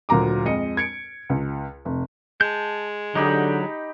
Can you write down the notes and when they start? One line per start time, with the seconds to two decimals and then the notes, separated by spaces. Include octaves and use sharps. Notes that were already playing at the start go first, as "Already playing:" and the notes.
0.09 D2 A#2 F#3 A#5 D6
0.45 F2 G#3 D#5 C#7
0.77 G#6 C#7 D7
1.30 C#2
1.85 F1
2.41 G#3 A5 G6
3.15 D3 F#3 D#4 G4 B5